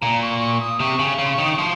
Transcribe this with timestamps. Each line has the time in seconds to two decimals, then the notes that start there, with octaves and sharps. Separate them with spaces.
0.01 A#2 A#5
0.22 C#6
0.40 C#6
0.60 D#6
0.80 C3 C#6
0.99 C#3
1.06 C#6
1.19 C#3
1.24 C6
1.32 C#6
1.38 D#3
1.44 D#6
1.51 C#6
1.58 F3 C6